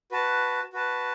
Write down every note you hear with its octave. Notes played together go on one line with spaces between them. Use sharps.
F#4 B4 A5
F#4 B4 A5